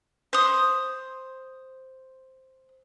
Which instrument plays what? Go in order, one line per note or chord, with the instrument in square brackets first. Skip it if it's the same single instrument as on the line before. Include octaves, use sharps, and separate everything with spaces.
[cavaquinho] C5 D#6